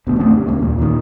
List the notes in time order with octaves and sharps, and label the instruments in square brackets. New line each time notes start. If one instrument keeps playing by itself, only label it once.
[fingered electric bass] E1 D2 B2 B3
F#2 A3 C4 C#4
G2
C#2 C#3 A#3
D#2 A#2
A#2 D#3